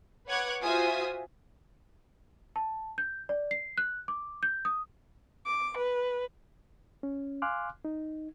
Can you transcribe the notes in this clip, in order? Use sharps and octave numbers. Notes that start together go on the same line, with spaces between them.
B4 C#5 F#5 D6 F#6 G#6
F4 F#4 C5 E5 G#5 D#6
A5
G6
D5
C7
F#6
D6
G6
D#6
D6
B4
C#4
F5 G#5 C6 D6 F6 F#6
D#4